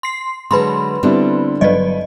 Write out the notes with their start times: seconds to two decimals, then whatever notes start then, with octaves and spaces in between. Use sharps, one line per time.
0.03 C6 C7
0.51 D3 F#3 G#3 B4 B5 C6
1.03 D3 G3 B3 C4 D4 E4
1.61 G1 F#3 B4 D5 D#5